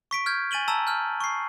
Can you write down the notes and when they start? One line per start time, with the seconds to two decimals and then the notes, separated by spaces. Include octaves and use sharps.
0.11 C#6 B6 D7
0.26 F6 G6 G#6
0.51 G#5 A6 D#7 F#7 G7
0.68 A5 A#5 E6
0.87 F6 G6
1.21 C#6 C7